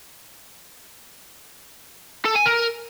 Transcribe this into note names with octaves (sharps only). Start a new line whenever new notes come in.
A4
G#5
A#4